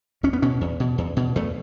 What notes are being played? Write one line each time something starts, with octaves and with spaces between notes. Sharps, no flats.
E2 C#4
B3
B2 C#4
E2
B2
E2
B2
E2 A3